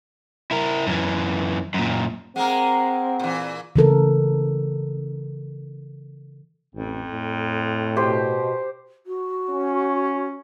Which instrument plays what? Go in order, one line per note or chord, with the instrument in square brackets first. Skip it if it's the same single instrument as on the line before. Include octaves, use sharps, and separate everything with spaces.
[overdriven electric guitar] E4 A#4
F#2 E3
F#2 A#2
[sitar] G#3 A#3 A#4 [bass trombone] C4 [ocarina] F#5
[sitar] A#2 E3
[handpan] C#3 E3 A4 A#4
[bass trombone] A1 [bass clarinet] F2
[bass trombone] A2
[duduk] B2 [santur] G4 C5
[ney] F#4
[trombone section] C#4